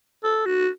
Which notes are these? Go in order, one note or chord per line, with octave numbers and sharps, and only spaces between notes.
A4
F#4